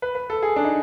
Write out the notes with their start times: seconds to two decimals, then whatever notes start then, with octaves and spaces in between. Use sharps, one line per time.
0.02 B4
0.15 B4
0.30 A4
0.43 G#4
0.56 D4
0.65 D#4